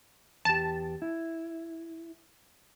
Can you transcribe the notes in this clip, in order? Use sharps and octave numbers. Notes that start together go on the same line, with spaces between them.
E2 G4 A5
E4